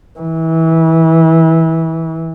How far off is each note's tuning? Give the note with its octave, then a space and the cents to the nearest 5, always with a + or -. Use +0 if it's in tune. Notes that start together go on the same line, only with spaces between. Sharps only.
E3 -25